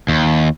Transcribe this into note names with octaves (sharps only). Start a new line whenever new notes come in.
D#2